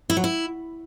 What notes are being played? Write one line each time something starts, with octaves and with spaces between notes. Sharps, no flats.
E4
F#3
E4